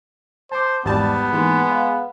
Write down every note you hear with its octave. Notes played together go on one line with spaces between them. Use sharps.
C5 A5 D6
G#1 E2 G3 B3 D5 A5
E3 G#3 A#3 D#4
F5